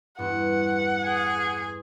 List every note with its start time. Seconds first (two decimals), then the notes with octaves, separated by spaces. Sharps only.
0.18 E2 G2 F#5
1.04 G#4 G#5